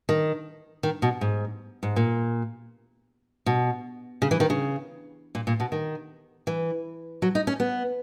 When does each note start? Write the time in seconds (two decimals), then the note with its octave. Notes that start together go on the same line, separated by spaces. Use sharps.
0.09 D#3
0.83 D#3
1.02 B2
1.21 G#2
1.83 G#2
1.96 A#2
3.46 B2
4.22 C#3
4.31 E3
4.40 D#3
4.50 C#3
5.35 A#2
5.47 A#2
5.60 B2
5.72 D#3
6.47 E3
7.22 F#3
7.35 D#4
7.47 C#4
7.60 B3